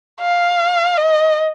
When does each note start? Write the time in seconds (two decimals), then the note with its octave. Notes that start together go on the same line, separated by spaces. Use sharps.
0.20 F5
0.97 D#5